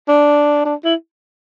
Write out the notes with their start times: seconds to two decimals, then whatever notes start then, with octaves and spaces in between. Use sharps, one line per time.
0.08 D4
0.65 D4
0.84 E4